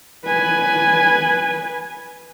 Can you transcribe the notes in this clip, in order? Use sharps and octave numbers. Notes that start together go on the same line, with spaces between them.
B4 G#5